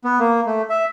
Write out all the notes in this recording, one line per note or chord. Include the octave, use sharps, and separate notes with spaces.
B3
A#3
A3
E5